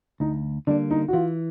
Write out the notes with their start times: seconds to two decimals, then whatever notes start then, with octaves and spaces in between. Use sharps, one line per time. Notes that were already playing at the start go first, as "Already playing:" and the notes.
0.20 D2 D#4
0.67 D3 G3 A#3 D4
0.91 D#4
1.08 F#4
1.13 E3 F4